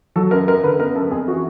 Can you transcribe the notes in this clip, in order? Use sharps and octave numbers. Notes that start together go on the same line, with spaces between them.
F#3 A4
F#2 A#4
F#2 A#4
D3 B4
B3 A#4
F#2 A4
F2 G#4
E3 F#4